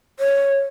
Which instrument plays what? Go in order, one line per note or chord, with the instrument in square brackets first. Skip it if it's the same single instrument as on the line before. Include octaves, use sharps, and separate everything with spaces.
[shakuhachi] C#5